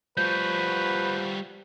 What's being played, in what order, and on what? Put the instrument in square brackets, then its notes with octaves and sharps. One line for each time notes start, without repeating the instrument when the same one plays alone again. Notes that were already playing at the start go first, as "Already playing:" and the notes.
[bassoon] F3 [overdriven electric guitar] G3 F#4 [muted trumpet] B4 [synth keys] G6